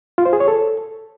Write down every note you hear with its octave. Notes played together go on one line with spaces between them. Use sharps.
F4
C5
G#4
C#5
A4